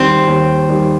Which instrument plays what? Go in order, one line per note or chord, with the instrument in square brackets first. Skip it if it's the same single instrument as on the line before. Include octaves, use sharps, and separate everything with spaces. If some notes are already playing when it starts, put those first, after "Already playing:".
Already playing: [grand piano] D#2 D#3 G3 [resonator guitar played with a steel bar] C4
[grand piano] D#2
D#3 G3